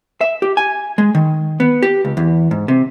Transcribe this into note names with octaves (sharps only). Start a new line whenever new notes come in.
E5
G4
G#5
G#3
D#3
B3
G4
C#2
E2
G#2
C3